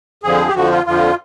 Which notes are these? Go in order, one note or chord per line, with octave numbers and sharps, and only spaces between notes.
F2 D3 F3 G#4
G4
F2 D3 F3 F#4
F4
F2 D3 F3 F4